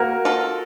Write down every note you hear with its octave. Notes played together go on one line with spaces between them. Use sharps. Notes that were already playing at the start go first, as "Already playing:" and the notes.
Already playing: A#3 F#4 A#4
F4 A4